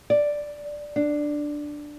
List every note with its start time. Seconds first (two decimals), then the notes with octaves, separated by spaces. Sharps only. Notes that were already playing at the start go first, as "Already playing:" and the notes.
0.10 D5
0.96 D4